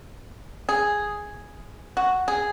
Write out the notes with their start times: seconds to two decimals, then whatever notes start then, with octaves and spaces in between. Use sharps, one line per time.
0.69 G#4
1.97 F#4
2.28 G#4